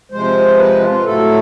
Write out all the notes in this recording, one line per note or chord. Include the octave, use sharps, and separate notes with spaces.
C3 F3 G#3 C5
B4
F4
A2 F#3 A3 A4